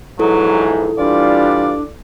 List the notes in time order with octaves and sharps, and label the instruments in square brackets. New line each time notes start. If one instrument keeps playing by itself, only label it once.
[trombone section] A#1 G#2 E3 [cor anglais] F#3 [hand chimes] E4 A4
[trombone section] E3 G3 F4 [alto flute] D4 [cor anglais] D5